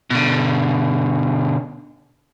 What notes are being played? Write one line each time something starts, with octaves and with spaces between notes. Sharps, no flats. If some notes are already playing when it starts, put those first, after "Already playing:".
B2 D3